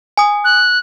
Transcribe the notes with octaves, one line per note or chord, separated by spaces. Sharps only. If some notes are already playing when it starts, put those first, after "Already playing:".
G#5 D#6
F#6